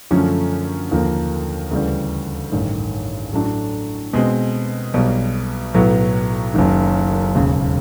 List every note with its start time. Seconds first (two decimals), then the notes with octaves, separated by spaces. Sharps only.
0.11 F#2 D3 F3 A3 C#4
0.91 D#2 D3 F3 A#3
1.71 D2 C#3 E3 G3
2.52 A1 G2 D#3
3.33 A2 F#3 A3 D4
4.13 B2 G#3 C4
4.94 B1 B2 G3
5.74 B1 A2 F#3 B3
6.54 F#1 F#2 D#3
7.35 E1 D#2 C#3